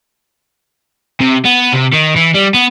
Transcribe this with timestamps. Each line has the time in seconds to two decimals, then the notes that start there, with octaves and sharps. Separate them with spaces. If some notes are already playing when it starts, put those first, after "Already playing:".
1.21 C3
1.45 B3
1.73 C3
1.93 D#3
2.16 E3
2.34 G3
2.54 B3